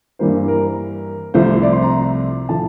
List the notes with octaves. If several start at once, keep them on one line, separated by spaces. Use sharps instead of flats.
G2 E3 G3 A#3 C5
A#4
C2 C3 F3 A3 C5
D5
C6
A#5
A2 F3 A3 A5